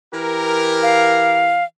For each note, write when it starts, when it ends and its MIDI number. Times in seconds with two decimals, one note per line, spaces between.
0.14 1.62 52
0.14 1.62 67
0.14 1.62 70
0.83 1.64 77